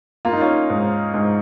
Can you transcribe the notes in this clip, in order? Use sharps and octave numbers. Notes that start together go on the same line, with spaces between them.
A#3 F4
D#4
C#4 F4
G#2
G#2